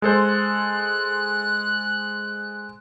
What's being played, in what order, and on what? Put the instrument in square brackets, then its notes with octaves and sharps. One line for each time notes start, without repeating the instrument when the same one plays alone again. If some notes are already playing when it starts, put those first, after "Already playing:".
[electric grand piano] G#3 A4 C5 [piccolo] F#6